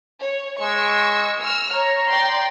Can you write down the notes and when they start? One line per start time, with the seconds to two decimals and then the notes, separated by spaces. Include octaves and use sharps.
0.22 C#5
0.60 G#3 C#6 E6
1.40 E6 F6
1.73 C#5 A#5
2.09 D5 G5 C6